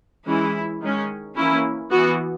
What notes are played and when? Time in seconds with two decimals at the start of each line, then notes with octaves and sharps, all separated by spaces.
0.26 E3 G#3 C#4 E4
0.81 D#3 G#3 C#4
1.36 E3 A#3 C#4 E4
1.90 E3 B3 F#4